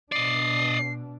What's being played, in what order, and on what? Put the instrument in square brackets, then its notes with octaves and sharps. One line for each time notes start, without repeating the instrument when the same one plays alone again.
[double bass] B2 D4 [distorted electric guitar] D5 D#5 [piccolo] C7